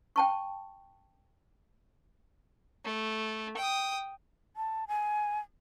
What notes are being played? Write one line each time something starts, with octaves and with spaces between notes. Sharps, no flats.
G5 A5 C#6
A3
G5 D#6
A5
G#5